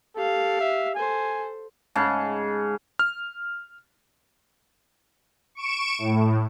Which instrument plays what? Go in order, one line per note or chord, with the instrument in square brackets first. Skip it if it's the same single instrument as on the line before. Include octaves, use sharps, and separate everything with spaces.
[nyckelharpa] G4 F5 [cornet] A4
[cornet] E5
[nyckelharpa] A4 C5 [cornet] G#5
[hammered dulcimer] G#2 C#3 A5
[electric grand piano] F6
[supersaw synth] C#6 D7 E7
A2